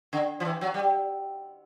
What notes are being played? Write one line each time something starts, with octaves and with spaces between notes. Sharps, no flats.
D3
F3
E3
F#3
G3